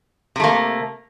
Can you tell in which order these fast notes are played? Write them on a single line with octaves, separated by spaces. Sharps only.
C3 A3 A#3